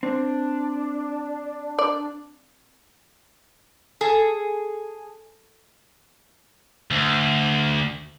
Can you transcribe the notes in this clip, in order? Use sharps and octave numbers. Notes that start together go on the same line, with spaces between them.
C4 D4
D5
G#4 A4
D2